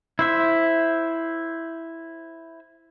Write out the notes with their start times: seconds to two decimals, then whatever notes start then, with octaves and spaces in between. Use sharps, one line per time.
0.19 E4 C5 E5